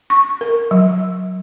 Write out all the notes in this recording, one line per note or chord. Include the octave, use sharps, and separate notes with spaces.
C#6
A#4
F#3